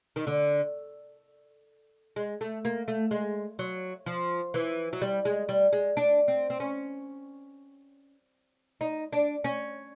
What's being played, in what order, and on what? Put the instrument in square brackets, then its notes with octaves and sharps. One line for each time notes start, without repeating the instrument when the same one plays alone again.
[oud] D#3
D3
G#3
A3
A#3
A3
G#3
F#3
F3
E3
F#3
G3
G#3
G3
G#3
D4
C4
C4
C#4
D#4
D4
C#4